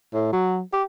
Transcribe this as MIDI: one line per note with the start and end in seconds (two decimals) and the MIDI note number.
0.14 0.30 45
0.33 0.60 54
0.73 0.83 67